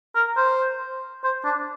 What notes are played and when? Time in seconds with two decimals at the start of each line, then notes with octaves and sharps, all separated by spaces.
0.15 A#4
0.37 C5
1.24 C5
1.44 D4